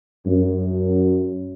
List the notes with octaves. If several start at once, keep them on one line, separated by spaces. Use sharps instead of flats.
F#2